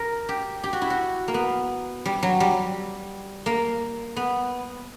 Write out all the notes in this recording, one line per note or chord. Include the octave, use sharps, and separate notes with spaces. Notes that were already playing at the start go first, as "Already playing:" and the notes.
Already playing: A#4
G4
G4
F#4
E4
F#4
A#3
B3
G3
F#3
G3
A#3
B3